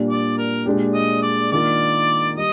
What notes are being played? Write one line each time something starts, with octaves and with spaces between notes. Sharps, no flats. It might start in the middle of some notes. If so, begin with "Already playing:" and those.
Already playing: A#2 G3 D4
D5
A#4
A#2 G#3 D4 G4
D#5
D5
D#3 A#3 D4 F4 A#4 D5
G3 D#5